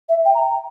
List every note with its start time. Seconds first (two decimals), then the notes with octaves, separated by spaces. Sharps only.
0.09 E5
0.25 G5
0.35 A#5